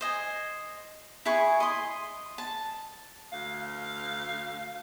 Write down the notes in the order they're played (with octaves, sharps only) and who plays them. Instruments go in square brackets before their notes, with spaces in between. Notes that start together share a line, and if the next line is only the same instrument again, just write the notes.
[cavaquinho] C5 D#5 G#5
E4 G#4 G#5 C#6
D#5 C6
A5
[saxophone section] D2 F5